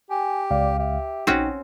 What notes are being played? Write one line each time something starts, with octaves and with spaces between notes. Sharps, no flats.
G4 G#5
C#2 D5 F5
G4 E5
A#1 C4 C#4 D#4 F#4 G5